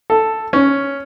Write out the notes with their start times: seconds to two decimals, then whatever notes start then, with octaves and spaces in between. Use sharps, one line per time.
0.10 A4
0.53 C#4